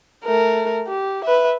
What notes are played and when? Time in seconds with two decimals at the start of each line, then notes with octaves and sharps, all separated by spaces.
0.24 A3 A#4
0.88 G4
1.24 B4 E5